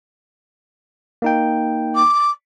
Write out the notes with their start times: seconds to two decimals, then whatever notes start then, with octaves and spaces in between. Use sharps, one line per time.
1.22 A#3 D#4 G5
1.95 D6